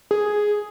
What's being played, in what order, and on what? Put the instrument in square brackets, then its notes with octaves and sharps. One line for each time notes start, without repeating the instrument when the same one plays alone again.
[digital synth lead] G#4